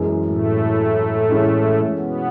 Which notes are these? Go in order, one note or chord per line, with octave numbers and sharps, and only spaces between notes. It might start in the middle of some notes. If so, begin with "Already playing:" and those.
Already playing: F#2 E3 G#3
A2 A3
E3 G#3 C#4
B2 B3